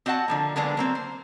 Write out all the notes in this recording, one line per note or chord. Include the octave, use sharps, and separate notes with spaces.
C4 F#4 D#5 F#5 A5
D3 F3 A#3
D3 F#3 G#3 A#3 B3 D4
F#3 A#3 C4
C5